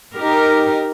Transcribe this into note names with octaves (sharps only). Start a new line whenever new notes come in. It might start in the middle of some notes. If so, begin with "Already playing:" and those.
D#4 G4 A#4